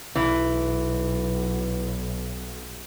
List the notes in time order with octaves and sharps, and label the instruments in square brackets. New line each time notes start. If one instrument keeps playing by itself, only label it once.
[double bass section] B1 [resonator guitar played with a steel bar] E3